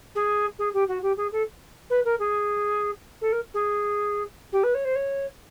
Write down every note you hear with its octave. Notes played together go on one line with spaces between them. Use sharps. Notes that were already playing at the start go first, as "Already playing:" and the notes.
G#4
G#4
G4
F#4
G4
G#4
A4
B4
A#4
G#4
A4
A#4
G#4
G4
B4
C#5
C5
C#5